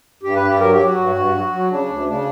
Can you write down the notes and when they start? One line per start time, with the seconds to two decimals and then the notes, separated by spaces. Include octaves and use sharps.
0.23 G2 G4
0.36 B4
0.42 G2
0.48 G4
0.60 F#3 A#4
0.72 G4
0.79 F#3
0.84 F#4
0.97 G2
1.15 G2
1.34 F#3
1.52 F#3
1.70 C#3 D4
1.88 D2
2.07 C#3 D4